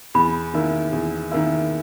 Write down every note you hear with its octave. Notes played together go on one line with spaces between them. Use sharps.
E2 B5
D#3 A#3 E4
E2
D#3 A#3 E4